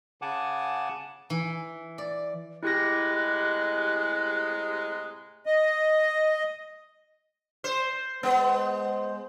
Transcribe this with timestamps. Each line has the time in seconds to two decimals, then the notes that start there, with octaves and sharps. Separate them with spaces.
0.22 C#3 F#5 G#5 A5 D6
1.30 E3
1.98 D5
2.63 A2 C3 G#3 E4 G4 F#6 A#6
5.46 D#5
7.64 C5
8.23 G#3 B3 C5